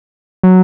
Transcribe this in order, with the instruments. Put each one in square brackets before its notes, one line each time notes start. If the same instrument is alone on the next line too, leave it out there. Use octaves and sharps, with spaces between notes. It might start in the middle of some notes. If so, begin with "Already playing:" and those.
[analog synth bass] F#3